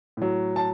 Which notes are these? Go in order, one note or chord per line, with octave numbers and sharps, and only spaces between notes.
A2 F#3
A5